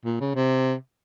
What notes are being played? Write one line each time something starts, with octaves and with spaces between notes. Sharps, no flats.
A#2
C#3
C3